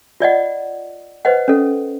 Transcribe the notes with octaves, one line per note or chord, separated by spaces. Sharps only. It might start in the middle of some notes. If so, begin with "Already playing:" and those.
F4 D5 D#5 F#5
B4 C5 D#5 F#5
C#4 A4